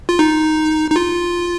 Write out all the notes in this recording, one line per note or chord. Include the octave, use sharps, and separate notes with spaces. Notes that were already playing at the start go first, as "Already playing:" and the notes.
F4
D#4
D#4
F4